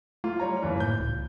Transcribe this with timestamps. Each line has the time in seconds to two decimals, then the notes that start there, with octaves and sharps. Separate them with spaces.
0.24 A3 F4
0.40 G3 C#5 A#5
0.63 F#1 D#2 E3
0.80 A2 G6
1.00 C#2